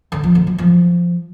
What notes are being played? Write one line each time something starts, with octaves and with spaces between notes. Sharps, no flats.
D3
F3
D3
F#3
F3